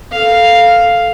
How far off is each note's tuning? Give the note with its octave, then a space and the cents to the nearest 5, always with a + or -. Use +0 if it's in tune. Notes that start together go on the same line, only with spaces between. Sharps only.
A4 -10 F5 +0